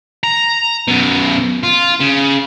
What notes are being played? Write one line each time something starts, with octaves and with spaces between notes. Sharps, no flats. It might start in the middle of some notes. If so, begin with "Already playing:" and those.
A#5
F#2 B2
F4
C#3